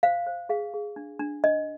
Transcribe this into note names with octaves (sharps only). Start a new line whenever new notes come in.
C5 F5
C5
G#4 F5
G#4
D4
D4
D4 D#5